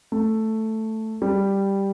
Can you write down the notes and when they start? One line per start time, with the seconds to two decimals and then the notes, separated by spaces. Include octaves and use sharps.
0.12 A3
1.22 G3